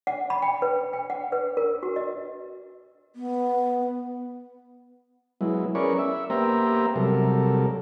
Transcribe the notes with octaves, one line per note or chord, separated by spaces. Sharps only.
F#5
B5
G5
B4
G5
F#5
B4
A#4
F#4
D#5
B3
F#3 G#3 B3 E4
C#4 G#4 A#4 B4 D5 C#6
E5
A#3 B3 G4 C5 E5 A#5
C3 F#3 G3 A4 A#4